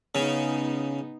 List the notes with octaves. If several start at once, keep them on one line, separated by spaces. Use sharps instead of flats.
C#3 B3 D#4